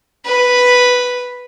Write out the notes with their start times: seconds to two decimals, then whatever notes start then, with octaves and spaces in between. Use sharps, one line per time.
0.25 B4